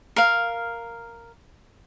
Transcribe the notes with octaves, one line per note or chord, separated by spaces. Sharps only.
A#4 F5